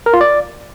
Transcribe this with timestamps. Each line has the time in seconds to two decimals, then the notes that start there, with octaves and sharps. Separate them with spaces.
0.06 A#4
0.14 F4
0.21 D5